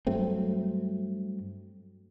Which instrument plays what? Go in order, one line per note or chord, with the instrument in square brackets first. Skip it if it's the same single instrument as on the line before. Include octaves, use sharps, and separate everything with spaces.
[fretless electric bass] G2 F#3 A3 C4